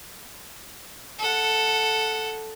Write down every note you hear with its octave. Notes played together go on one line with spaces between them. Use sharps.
A4 F#5